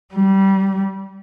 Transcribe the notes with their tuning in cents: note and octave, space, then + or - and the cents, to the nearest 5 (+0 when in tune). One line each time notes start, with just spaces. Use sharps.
G3 -20